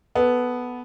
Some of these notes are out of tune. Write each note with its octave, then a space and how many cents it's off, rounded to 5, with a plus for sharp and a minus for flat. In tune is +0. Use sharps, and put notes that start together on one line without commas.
B3 +0 A4 -15